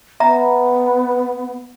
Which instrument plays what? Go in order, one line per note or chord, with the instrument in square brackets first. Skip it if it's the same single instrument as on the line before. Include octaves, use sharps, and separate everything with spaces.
[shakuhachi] B3 [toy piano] E5 A#5